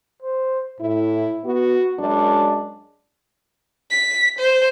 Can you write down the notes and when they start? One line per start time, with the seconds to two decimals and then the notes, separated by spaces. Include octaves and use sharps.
0.22 C5
0.81 A2 E4
1.45 B3 F#4
1.99 F#2 G#3 D4
3.90 B6
4.39 C5